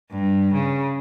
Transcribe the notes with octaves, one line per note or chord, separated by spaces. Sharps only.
G2
C#3